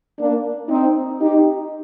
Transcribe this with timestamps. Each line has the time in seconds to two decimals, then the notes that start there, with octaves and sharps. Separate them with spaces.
0.18 A#3 D4
0.69 C4 D#4
1.20 D#4 G4